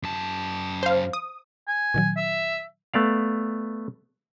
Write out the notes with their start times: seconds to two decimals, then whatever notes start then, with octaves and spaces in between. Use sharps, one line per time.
0.03 F#2 A5
0.83 C5 F5
1.13 D#6
1.67 G#5
1.94 A#2 D#3 F#3
2.16 E5
2.94 A3 B3 D5 F5